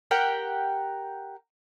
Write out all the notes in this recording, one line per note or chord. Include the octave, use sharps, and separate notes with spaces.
G4 A#4 F#5 G5